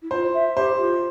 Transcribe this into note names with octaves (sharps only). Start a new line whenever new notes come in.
E4
F4 C5
E5
G4 C5
F4